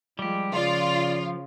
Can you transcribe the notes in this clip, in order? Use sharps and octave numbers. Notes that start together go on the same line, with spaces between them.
F3 G3 G#3 G4
C#3 F3 F4 D5